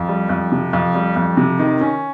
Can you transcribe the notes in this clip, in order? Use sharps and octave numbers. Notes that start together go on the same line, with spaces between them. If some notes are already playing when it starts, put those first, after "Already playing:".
Already playing: F2
G3
F2
C3
F2
G3
F2
C3
D#3
C#4